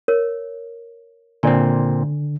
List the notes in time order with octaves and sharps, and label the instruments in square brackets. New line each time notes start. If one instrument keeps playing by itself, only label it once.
[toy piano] A#4 C#5
[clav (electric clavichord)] A#2 C4 [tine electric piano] D3 [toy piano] D5 G#5